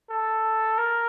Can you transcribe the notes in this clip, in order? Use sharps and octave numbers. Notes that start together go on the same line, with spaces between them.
A4
A#4